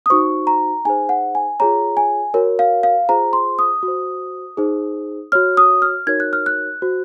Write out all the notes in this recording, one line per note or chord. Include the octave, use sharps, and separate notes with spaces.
D#6
D#4 F#4 C5 C#6
A#5
D#4 G#4 C5 G#5
F#5
G#5
F4 G#4 C#5 A#5
G#5
F#4 A#4 C#5
F5
F5
F4 G#4 C5 A#5
C6
D#6
F#4
C5
D#4 G#4 C5
F#4 C#5 F6
D#6
F6
D#4 F#4 A#4 C#5 G#6
F#6
F6
F#6
F#4 C5